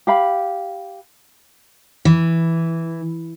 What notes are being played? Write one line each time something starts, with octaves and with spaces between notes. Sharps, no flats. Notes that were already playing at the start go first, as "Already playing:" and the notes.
G4 F5 B5
E3